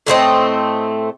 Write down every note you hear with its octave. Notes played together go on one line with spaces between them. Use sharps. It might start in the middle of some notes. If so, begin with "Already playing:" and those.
A2 A3 C4 D#5